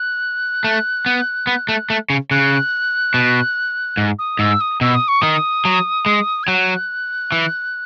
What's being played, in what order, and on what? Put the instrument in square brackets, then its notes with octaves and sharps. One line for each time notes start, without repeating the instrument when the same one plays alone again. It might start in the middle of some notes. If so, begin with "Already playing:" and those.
Already playing: [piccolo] F#6
[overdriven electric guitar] A3
B3
B3
A3
A3
C#3
[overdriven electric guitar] C#3 [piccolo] F#6
[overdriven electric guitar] B2
G#2
[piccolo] D#6
[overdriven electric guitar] G#2 [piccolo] E6
[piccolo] D#6
[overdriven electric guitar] B2 [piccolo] E6
[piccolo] D#6
C#6
[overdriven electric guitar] D#3 [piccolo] D#6
[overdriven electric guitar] F#3
G#3
[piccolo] G#6
[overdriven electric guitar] F#3 [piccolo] F#6
[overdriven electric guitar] E3